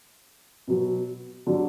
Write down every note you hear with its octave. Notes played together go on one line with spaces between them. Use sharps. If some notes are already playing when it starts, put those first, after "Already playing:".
B2 F#3 B3
D3 F#3